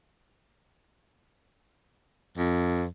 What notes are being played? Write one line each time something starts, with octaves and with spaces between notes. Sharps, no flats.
F2